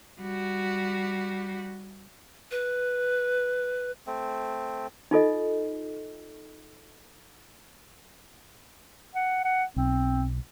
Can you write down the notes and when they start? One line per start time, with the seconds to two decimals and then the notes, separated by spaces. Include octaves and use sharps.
0.20 G3 F#4
2.51 B4
4.07 A3 C4
5.11 D#4 F4 A4 D#5
9.15 F#5
9.45 F#5
9.76 B1 C4